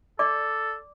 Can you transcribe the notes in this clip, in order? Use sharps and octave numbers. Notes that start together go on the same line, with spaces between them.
A4 D5 D6